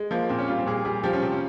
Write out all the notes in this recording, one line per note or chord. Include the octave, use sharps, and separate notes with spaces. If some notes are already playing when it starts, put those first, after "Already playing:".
Already playing: G#3
F3 A#3
A#2 C4
C#4
G3 F4
C4
A#2 G#4
G3 G#4
F3 G4
C#4
C3 C4
C#4